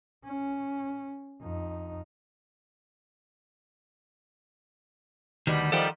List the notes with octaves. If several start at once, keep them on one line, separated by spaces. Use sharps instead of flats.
C#4
F2 D#4
D2 B2 D#3 G3
D#3 F3 G3 A4 F#5 G5